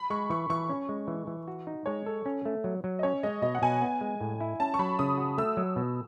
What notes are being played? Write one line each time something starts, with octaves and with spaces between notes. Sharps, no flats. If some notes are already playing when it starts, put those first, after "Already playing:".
Already playing: B5
G#3 C#6
E3 C#6
E3 C#6
C#4
G#3
E3
E3
F#4
D#4
G#3 C#5
A4
C#4
A3
F#3
F#3
D#5
C#4 C#5
G#3 D#5
B2 D#5
F#5
B2 G#5
B3
G#3
A2
E4
C#4 A5
C#6
F#3 B5
C#3 D#6
F#4
A3 E6
F#3
B2